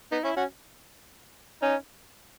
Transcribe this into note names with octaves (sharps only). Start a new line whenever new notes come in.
B3 D#4
C#4 E4
C#4 F#4
C#4 D#4